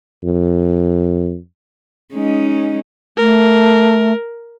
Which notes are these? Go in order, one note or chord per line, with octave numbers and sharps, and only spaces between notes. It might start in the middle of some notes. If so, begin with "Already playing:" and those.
F2
G#3 C#4 D#4
A3 A#4